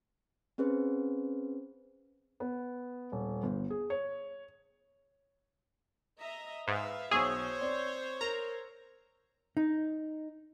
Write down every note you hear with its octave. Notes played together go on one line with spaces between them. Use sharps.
C4 C#4 G#4 B4 C5
B3
D#1
G1
G#4
C#5
D#5 E5 A#5
G#2 B4 E5 F5
B1 G#4 C5 C#5 C#6 E6
C4 D5
A#4 A#5
D#4